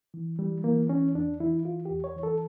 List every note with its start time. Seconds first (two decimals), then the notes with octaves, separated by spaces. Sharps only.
0.14 E3
0.39 E3 G3
0.64 E3 A#3
0.89 E3 C#4
1.15 E2 D4
1.40 E3 E4
1.65 E3 F4
1.85 G4
1.91 E2
2.04 C#5
2.16 E3
2.23 A4